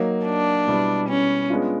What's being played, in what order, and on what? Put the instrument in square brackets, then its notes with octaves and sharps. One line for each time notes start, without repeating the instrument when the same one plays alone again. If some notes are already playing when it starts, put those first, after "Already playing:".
Already playing: [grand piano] F#3 A#3 D#4
[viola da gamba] D4
[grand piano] B2 G3 B3 E4
[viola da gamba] C#4
[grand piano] G#3 B3 D4 F4